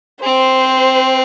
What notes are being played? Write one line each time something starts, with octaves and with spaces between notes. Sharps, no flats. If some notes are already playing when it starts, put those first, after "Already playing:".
C4 C5